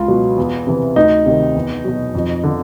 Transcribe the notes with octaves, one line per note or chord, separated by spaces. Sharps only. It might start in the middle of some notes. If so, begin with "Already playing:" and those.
Already playing: C#2 F4
B2 F#3
E2
C3 E3
D2 D#4
C3 D#3
E2
B2 F#3
F2
D3 F3